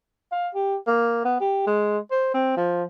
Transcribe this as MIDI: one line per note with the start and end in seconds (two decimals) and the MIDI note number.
0.32 0.49 77
0.54 0.76 67
0.87 1.20 58
1.25 1.37 59
1.41 1.66 67
1.67 1.98 56
2.11 2.33 72
2.34 2.53 60
2.57 2.84 53